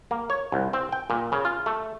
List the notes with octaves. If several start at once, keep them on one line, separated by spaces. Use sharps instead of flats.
A#3
C#5
C2
C4
G5
A#2
C#3
F4
A3